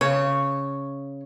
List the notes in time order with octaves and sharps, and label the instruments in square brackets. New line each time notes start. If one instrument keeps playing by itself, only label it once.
[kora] C#3 [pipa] C#5